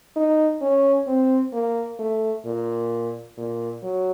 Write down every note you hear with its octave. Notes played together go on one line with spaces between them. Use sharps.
D#4
C#4
C4
A#3
A3
A#2
A#2
F#3